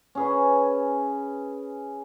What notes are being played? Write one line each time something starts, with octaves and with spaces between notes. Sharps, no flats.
C#4 G#4 B4